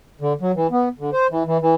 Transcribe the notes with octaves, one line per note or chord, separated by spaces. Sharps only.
D3
F#3
E3
B3
D3
C5
E3
E3
E3